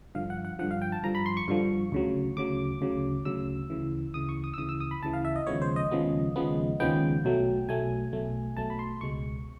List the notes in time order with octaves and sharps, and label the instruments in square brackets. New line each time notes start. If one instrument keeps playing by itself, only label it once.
[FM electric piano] G2 D3 F3 F5
F#5
F#5
G2 D3 F3 F#5
F5
G5
A5
G2 D3 F3 A#5
B5
C6
C#6
G2 D3 F3
D2 C#3 F#3
D2 C#3 F#3 D6
D2 C#3 F#3
D2 C#3 F#3 E6
D2 C#3 E3
D2 C#3 E3 D#6
C#6
D#6
E6
D2 C#3 E3 D#6
E6
D#6
B5
D2 C#3 E3 A5
F5
E5
D#5
D#2 C#3 F3 G#3 B3 C#5
C5
D#5
D#2 C#3 F3 G#3 B3
D#2 C#3 F3 G#3 B3
D#2 C#3 F3 G#3 B3 G5
B1 B2 F#3 A3
B1 B2 F#3 A3 G#5
B1 B2 F#3 A3
B1 B2 F#3 A3 A5
B5
C6
C#2 B2 G#3 C#6